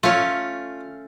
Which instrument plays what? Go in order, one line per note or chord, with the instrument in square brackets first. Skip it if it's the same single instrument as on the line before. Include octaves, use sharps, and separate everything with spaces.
[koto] A3 C#4 [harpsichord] F4